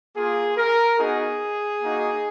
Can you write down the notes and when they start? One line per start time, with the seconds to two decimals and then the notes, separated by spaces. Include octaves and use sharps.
0.16 A#3 F4 G#4
0.57 A#4
0.98 B3 D#4 F#4 G#4
1.82 A#3 D#4 F#4